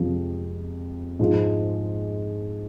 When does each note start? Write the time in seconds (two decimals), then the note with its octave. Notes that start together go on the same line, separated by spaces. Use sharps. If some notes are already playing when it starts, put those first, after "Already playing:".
Already playing: F2 C3 F3 G#3
1.19 G#2 F3 G#3